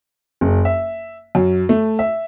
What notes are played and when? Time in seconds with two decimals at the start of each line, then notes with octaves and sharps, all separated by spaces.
0.41 F#1
0.65 E5
1.35 F#2
1.69 A3
1.99 E5